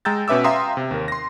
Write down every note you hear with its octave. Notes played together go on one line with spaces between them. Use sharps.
G#3 G5 A#5 E6 G6 A6
B2 C#4 B4 E5 D6 E6
E5 F5 G5 A#5 C6 D#6
C3
D#2 A#4
C6 A#6